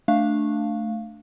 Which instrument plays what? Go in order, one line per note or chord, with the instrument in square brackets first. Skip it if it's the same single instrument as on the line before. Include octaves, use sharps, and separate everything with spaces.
[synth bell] A3 D4 F5